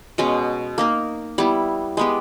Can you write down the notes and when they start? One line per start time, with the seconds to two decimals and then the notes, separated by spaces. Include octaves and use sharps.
0.18 B2 G#3 C#4
0.78 A#3 D#4 A#4
1.38 G3 B3 E4
1.97 G#3 B3 G4